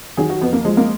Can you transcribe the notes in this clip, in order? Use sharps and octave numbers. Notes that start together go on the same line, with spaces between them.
D#3 F#3 G#4
F#4
F2 B3
A#3
F3 G#3
A#3